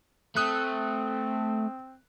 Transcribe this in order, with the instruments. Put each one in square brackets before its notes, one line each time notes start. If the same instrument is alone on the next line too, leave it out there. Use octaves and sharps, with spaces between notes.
[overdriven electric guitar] A3 [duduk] C4 [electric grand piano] D#6 F#6